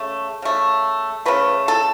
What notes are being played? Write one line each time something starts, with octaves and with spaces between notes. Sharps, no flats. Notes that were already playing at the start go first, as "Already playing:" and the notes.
Already playing: C#3 A3
C#3 A3
C#3 A3 B4
A4